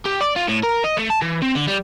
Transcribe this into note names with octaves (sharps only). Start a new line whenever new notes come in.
G4
D5
F4
A2
A#4
D#5
A3
A5
E3
C4
D3
G3